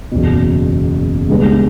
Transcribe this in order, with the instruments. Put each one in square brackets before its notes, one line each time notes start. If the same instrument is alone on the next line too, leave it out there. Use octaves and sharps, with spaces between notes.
[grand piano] F#1 E2 B2
C#2 C#3 G3 B3 D4